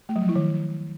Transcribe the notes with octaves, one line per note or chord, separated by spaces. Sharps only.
A3
F#3
F3
E4
D#3